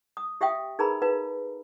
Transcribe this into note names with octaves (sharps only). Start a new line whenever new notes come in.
D#6
G4 E5 F5 G5 D#6
D#4 G#4 A#4 B4 A#5 B5
D#4 B4 F5